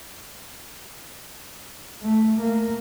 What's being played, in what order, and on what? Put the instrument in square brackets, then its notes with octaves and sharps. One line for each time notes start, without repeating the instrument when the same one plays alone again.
[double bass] A3
A#3